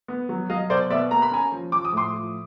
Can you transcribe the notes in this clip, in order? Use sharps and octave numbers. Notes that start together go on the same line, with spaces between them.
B3
F#3
F#3 D#5 F5
B2 C5 D5
B3 D5 E5
A#3 A#5
B5
C#4 G#5 A#5
F3
F3 D6
D#6
A2 C6 D6
F3